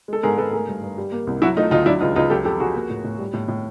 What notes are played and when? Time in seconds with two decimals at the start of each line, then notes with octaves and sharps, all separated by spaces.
0.08 G#3 A4
0.23 G#2 G#4 A#4
0.38 G#2 A4 B4
0.53 A3 G#4 A#4
0.68 G2
0.83 G2
0.98 G3
1.12 A#3
1.27 C2
1.42 F#3 E4 F#4
1.57 A3 D#4 F4
1.71 D2 D#4 F4
1.86 F#3 D4 E4
2.01 C#2 D#4 F4
2.16 C#2 D#4 F4
2.30 F#3 G4 A4
2.45 F2 G4 A4
2.60 F2 F#4 G#4
2.75 A#3
2.90 A2
3.04 A2
3.19 G3
3.33 A2
3.48 A2